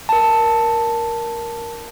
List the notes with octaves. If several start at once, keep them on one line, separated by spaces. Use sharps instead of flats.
A#4 A5